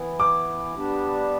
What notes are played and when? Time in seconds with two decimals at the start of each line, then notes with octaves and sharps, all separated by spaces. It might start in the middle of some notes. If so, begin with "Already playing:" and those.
Already playing: E3 B3 E4
0.20 D6
0.75 G3 B3 D4 G4